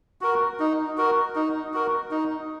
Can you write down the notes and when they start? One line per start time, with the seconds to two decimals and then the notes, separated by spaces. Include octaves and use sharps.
0.21 F#4 A#4
0.60 D#4
0.97 F#4 A#4
1.35 D#4
1.73 F#4 A#4
2.11 D#4